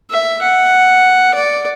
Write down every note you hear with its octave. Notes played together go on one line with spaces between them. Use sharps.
E5
F#5
D5